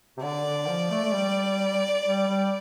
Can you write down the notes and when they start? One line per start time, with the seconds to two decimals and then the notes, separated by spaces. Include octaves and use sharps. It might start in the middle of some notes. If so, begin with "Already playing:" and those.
0.17 C3
0.22 D3 D5
0.45 D3
0.68 F3
0.91 A3
1.05 A3
1.13 G3
2.05 G3
2.28 G3